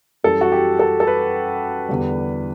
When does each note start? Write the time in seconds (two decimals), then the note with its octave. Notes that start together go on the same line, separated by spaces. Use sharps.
0.24 F#2 E3 G3 A4
0.41 F#4
0.52 G4
0.79 A4
1.00 A4
1.07 B4
1.89 E2 D3 G3